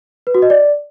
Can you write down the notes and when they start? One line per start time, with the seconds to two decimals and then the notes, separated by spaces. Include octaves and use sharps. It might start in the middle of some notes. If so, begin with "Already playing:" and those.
0.27 B4
0.35 F#4
0.42 D#5
0.50 D5